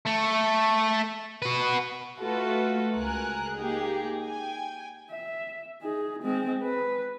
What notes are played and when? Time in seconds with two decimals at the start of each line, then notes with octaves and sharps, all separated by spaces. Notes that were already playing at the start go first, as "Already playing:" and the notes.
0.06 A3
1.42 F#4 B4
2.20 A3 F4 F#4 A4 B4
2.94 C#2 A#4 G#5 F#6
3.55 A#3 D#4 G4 G#4
4.23 G5 G#5
5.11 E5
5.82 D#4 G#4
6.22 G#3 C4
6.63 B4